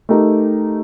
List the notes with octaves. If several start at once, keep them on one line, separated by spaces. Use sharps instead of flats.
A3 D#4 G4 A#4